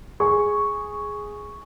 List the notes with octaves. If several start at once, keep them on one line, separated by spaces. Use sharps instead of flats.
G#4 C#6